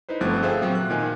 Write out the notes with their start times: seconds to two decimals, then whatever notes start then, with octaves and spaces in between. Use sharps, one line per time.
0.09 D#4 E4 B4 C5
0.21 G1 F3 A3 C4 F#6
0.42 G#4 A4 C5 E5 F5 G5
0.61 A#2 F#3 C4
0.75 F#6
0.90 A#2 D#3 G#5